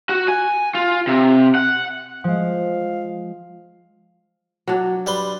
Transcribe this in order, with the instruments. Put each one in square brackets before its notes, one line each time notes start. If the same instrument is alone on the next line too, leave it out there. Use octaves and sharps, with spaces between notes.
[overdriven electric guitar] F#4
G#5
F4
C3
F#5
[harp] F3 G#3 [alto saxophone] F5
[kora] F#3 D4
[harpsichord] G3 B4 C6